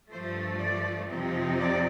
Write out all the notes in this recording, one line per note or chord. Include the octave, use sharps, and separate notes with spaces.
G2 F3 A3 C5
D5
F2 C3 F3 C4 D#4
D5